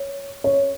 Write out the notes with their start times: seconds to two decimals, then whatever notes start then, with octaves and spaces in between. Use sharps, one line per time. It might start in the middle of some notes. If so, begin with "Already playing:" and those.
Already playing: C#5
0.44 C#5